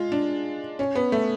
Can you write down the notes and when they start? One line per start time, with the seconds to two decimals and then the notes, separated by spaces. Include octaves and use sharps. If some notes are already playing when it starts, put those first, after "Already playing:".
Already playing: G#3 F4
0.12 D4
0.79 C#4
0.95 B3
1.12 A3